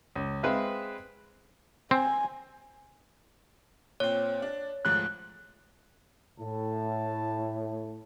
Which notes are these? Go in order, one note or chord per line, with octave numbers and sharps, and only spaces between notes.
C#2
G#3 C4 B4 E5 F5
C4 G#5
A#2 C4 C#5
D4
D2 G#2 F3 F#6
A2 A5